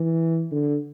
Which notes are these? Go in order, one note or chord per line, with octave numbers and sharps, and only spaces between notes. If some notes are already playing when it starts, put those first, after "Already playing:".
Already playing: E3
D3